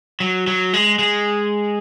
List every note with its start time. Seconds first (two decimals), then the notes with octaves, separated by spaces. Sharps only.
0.20 F#3
0.47 F#3
0.73 G#3
0.99 G#3